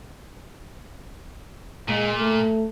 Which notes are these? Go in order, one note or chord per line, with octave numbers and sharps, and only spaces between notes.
A#2 G#3
A3